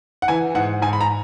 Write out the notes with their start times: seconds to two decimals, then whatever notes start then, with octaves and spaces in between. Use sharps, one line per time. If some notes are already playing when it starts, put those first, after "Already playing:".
0.22 F#5
0.28 E3 G#5
0.55 G#2 F#5
0.82 G#2 G#5
0.93 B5
1.01 A#5